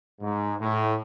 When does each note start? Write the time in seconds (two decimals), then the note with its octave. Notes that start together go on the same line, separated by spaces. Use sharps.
0.20 G#2
0.60 A2